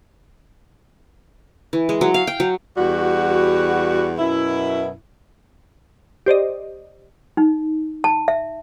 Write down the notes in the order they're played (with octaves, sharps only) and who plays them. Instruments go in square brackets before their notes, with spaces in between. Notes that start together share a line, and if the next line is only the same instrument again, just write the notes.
[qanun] E3
G#3
F#3
F5
G5
F#3
[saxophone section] E2 G3 F#4
F#2 B2 E4
[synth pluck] G4 C5 D5 D#5
[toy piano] D#4
A5
E5